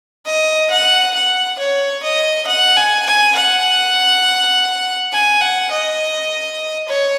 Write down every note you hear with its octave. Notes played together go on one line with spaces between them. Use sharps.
D#5
F#5
F#5
C#5
D#5
F#5
G#5
G#5
F#5
G#5
F#5
D#5
C#5